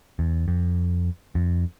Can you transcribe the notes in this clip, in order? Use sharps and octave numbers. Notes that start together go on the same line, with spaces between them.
E2
F2
F2